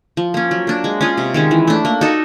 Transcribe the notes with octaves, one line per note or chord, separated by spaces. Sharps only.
F3
A#3 C#4
F#3
A#3 D4
G#3
C#4 F4 G#4
C3
D#3 G#3 C#4
E3
A3 D4
A#3
D#4 F#4 A4